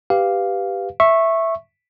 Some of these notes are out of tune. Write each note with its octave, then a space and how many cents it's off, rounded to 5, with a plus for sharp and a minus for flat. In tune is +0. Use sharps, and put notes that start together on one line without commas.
G4 +0 B4 +0 F5 +0
E5 +0 C#6 -15